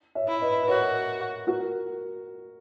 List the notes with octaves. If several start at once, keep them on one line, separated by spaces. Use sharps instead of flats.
C#5 E5
E4
B4 D#5
B4
F#4 A#4 C#5
F#4 A#4